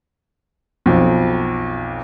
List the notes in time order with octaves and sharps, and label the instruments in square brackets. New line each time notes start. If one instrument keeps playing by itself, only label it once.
[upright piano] B1 F2